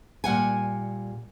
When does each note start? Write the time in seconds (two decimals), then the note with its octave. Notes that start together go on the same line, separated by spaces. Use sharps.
0.24 A#2 G3 F#5 G#5